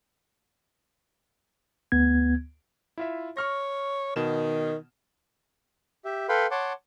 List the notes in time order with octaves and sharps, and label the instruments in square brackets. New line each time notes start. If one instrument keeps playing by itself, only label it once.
[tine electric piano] D2 B3 G#6
[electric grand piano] E4 F4 E5
[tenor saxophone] C#5 [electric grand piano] C#6 F6 A#6
[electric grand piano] B2 E7 [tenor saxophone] D#3
[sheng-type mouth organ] G4 E5
A4 B4 F5 G5 B5 C6
C#5 F#5 A5 C6 D6